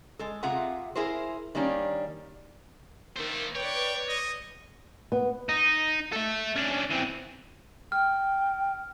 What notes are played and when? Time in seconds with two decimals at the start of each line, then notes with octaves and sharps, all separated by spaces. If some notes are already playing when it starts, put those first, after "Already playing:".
0.19 G#3 A4
0.43 C3 F4 G#4 E5 F#5 A#5
0.95 E4 G#4 A#4 C5
1.55 D#3 G3 A#3 C#4 D4
3.16 D#3 A3 A#3 C5
3.55 B4 C#5 D5 G5
4.08 D#5
5.12 B3
5.49 D#4
6.13 A4 E5
6.56 C#4 D4
6.90 E3 C4
7.92 G5 F6